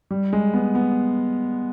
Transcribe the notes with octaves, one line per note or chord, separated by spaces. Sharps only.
G3
G#3
B3
B3